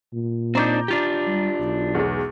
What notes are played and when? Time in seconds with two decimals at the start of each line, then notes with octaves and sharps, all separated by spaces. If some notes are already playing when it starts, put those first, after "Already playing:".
0.13 A#2
0.55 C4 D4 D#4 A#5 D6 G6
0.88 D4 F4 G4
1.27 G3
1.60 B1
1.95 E2 F#3 G#3